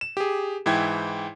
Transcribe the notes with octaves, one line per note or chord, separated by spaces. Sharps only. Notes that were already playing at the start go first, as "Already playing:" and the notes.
E7
G4 G#4
G#2 E3 E4 G5 G#6